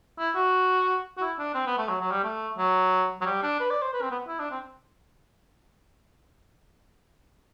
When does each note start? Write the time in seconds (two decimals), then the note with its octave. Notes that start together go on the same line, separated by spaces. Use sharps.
0.19 E4
0.35 F#4
1.17 F#4
1.21 E4
1.39 D4
1.54 C4
1.66 B3
1.78 A3
1.88 F#3
2.01 F#3
2.11 G3
2.24 A3
2.58 F#3
3.21 F#3
3.26 G3
3.43 D4
3.60 B4
3.70 D5
3.82 C5
3.93 B4
4.02 C4
4.11 B3
4.28 E4
4.39 D4
4.51 C4